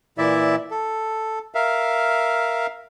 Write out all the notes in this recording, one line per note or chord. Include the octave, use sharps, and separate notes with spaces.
A#2 E3 E4 D5 E5
A4
A#4 E5 F5